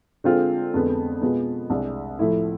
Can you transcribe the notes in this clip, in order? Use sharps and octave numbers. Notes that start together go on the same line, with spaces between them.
D3 G#3 C4 F4
F2 D3 G#3 B3
B2 G#3 B3 F4
C2 C3 G#3 D4
A2 F3 A3 E4